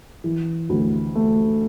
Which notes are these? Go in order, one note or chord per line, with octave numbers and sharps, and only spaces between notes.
E3
D2
A3